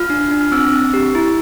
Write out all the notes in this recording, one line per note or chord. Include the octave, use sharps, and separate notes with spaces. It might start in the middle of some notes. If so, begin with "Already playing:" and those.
Already playing: F4 F6
D4
D4
F6
C4 E6
C4
G4
E4